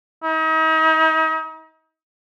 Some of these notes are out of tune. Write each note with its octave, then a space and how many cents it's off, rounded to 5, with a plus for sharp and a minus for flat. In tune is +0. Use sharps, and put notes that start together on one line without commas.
D#4 +40